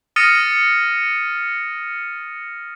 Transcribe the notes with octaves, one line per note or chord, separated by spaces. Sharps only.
D#6 F6 A6 A#6 C#7 D#7